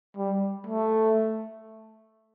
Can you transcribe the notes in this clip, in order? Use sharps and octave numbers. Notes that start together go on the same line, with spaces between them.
G3
A3